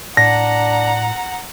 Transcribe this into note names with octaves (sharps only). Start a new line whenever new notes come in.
A2 D4 F#5 A#5 A#6